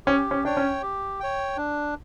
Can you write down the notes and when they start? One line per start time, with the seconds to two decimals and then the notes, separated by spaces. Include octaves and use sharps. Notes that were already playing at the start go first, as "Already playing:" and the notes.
0.06 C#4 G4
0.31 C#4
0.45 D4 C#5 G5
0.57 C#4
0.82 G4
1.20 C#5 G5
1.57 D4